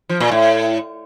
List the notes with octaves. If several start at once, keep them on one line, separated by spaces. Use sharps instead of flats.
F3
A#2
A2